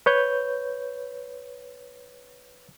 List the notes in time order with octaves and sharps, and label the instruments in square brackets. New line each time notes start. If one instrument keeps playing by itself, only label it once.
[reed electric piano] B4 C#5 G6